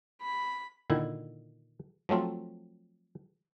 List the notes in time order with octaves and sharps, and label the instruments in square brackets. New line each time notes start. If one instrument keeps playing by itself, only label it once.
[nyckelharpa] B5
[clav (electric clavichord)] A#2 D3 D#3 E4
F3 F#3 A3 C4 F4